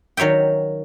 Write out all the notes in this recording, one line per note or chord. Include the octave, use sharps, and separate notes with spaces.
D#3 F#3 C#5 E5 G5